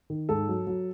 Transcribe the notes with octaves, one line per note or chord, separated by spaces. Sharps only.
D#3
G#2 A4
F#3
F#3